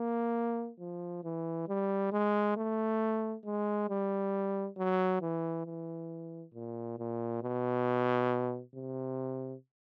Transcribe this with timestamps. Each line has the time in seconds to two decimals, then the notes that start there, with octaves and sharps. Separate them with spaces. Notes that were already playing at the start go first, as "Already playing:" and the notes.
Already playing: A#3
0.79 F3
1.24 E3
1.68 G3
2.12 G#3
2.57 A3
3.45 G#3
3.89 G3
4.77 F#3
5.22 E3
5.66 E3
6.54 A#2
6.98 A#2
7.42 B2
8.75 C3